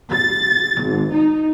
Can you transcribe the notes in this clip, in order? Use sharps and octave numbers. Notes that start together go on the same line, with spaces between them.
A6
G#1
D#4